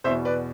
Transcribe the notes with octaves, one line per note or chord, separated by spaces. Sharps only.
E2 B2 C5 E5
B4 D5